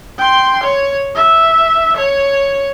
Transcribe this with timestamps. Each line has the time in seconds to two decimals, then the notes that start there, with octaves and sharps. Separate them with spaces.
0.19 G5 C6
0.64 C#5
1.16 E5
1.97 C#5